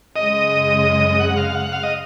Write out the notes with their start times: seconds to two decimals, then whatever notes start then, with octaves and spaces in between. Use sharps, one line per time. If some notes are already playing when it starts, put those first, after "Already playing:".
0.16 F#2 C#3 G#3 D#5
1.20 F#5
1.37 F5
1.55 F#5
1.72 F5
1.83 D#5